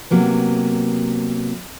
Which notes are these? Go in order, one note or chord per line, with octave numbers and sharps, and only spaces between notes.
C3 F#3 A#3 B3